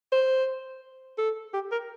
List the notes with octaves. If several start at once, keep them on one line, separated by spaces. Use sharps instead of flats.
C5
A4
G4
A#4